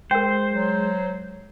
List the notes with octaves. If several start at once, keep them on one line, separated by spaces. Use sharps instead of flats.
G#3 A#4 C5 G5
F#3